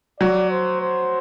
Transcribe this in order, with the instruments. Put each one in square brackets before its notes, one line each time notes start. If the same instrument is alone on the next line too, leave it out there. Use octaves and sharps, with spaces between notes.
[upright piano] F#3 [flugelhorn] D5
[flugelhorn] C5
C5